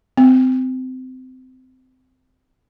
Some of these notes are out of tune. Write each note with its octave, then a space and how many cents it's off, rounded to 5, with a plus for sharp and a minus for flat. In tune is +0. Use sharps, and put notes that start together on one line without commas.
C4 -25